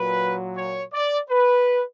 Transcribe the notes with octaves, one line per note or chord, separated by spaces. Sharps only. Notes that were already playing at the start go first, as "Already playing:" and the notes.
Already playing: A#2 F#3 B4
C#5
D5
B4